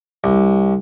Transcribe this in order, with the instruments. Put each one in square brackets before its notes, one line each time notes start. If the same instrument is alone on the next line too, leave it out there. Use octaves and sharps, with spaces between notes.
[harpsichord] C2